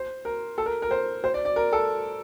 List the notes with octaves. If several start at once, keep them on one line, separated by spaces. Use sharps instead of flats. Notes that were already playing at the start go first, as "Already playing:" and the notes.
Already playing: C5
A#4
A4
A#4
A#4
C5
C5
D5
D5
A#4
A4